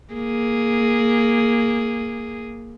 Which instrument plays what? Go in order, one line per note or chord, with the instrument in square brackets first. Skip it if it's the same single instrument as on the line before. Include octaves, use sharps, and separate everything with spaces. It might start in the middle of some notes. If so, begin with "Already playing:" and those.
[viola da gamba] A#3 G#4